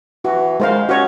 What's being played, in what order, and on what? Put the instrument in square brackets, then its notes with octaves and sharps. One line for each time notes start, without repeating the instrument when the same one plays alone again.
[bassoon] E3 [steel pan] F#4
[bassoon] D#3 [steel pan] G#3 C5 F5
[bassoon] C#4 [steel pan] F#4 C#5